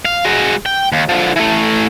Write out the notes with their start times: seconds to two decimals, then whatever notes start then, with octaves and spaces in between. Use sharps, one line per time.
0.05 F5
0.25 G#3 F#4
0.66 G5
0.92 D#2
1.09 D3 F3
1.36 E3 A3